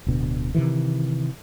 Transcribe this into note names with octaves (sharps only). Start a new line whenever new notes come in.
D1 B2 D3
C3 D#3 E3